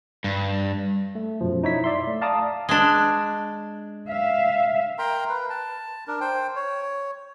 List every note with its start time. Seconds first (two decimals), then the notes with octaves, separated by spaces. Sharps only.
0.24 G2
1.15 A3
1.41 F#2 B2 F3
1.63 D#4 E4 C#5 E5 B6
1.84 D5 E5 C6
2.08 A3
2.21 D5 F5 A5 A#5 D6 D#6
2.69 G#3 D4
4.08 E5 F5
4.99 A#4 G5 A#5 C6
5.29 B4
5.50 A5
6.08 D4 A#4
6.21 C5 G5
6.56 C#5